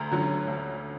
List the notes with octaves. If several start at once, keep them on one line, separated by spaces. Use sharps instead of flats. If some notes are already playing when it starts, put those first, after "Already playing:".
Already playing: D2 A#5
D3 F#3 C#4
D2